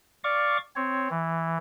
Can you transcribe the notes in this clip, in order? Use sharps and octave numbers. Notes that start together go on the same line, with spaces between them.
D5 F5 C#6 D6
C4 C#5
E3